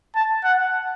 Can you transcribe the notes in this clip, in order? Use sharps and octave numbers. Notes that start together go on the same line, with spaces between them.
A5
F#5